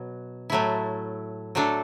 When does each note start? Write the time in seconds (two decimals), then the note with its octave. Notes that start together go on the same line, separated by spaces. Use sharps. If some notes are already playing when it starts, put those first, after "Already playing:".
Already playing: B2 F#3
0.50 A2 F#3 A3 E4
1.55 F#3 A3 D4 A4